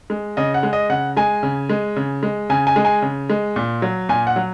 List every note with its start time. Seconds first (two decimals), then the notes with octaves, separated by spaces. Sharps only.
0.10 G#3
0.37 C#3 D#5
0.54 F#5
0.63 G#3
0.73 D#5
0.90 C#3 F#5
1.17 G#3 G#5
1.43 C#3
1.69 G#3
1.96 C#3
2.23 G#3
2.50 C#3 G#5
2.67 G#5
2.76 G#3
2.85 G#5
3.02 C#3
3.30 G#3
3.56 A#2
3.82 F#3
4.09 A#2 G#5
4.27 F#5
4.36 F#3